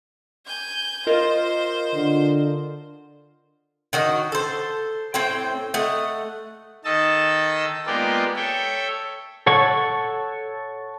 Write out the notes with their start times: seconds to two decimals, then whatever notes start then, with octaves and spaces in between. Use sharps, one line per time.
0.46 G#5 G6
1.07 F4 A#4 C5 D#5
1.94 D3
3.93 D#3 F#4 D#5
4.32 A4 C5
5.14 A2 C4 C5 G5
5.74 A3 D#5 F#5
6.85 D#3 A4 D#5 A5 E6
7.86 G#3 A#3 B3 F4 G4 D5
8.36 A4 C#5 E5 G5
9.46 A4 C#5 F#5 C#6